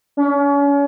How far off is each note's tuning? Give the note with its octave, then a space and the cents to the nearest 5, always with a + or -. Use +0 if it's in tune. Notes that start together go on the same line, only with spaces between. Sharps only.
C#4 +35